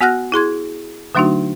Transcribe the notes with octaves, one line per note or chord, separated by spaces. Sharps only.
B3 F#4 F#5 F6 F#6 A#6
E4 G#4 C6 G#6
D3 F#3 A3 D4 D#4 F#4